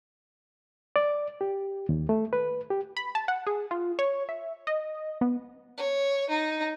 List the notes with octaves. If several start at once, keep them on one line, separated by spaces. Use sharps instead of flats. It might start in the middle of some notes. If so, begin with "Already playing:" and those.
D5
G4
D#2
A3
B4
G4
B5
A5
F#5
G#4
F4
C#5
E5
D#5
B3
C#5
D#4